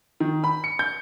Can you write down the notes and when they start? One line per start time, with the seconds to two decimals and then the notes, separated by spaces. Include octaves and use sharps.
0.20 D#3
0.44 B5
0.64 C#7
0.79 G6